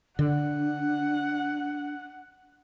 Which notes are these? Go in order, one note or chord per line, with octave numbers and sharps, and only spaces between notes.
D3 D4 F#5